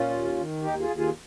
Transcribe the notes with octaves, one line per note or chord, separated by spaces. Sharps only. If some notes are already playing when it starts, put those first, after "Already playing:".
Already playing: A#2 C#4 F4
D#2
D#3
D#2 D#4 G4
F4 G#4
D#2
F4 G#4